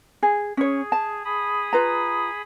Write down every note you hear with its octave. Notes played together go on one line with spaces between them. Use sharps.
G#4
C#4 G#4 C#5
A5
G#4 B5 D#6
F4 B4 A#5